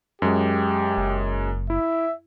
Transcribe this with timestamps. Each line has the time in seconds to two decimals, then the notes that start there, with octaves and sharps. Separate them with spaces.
0.22 F#2 G#3 G4
0.97 F#1
1.70 E4 E5